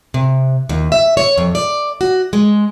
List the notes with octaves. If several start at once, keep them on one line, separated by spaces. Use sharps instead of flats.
C3
D#2
E5
C#5
F2
D5
F#4
G#3